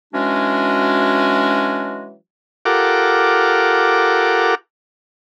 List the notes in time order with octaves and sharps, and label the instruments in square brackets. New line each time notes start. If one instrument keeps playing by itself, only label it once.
[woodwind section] E3 F#3 G#3 C#4 D4 F#4
[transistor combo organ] F4 G4 A4 A#4 F#5 D6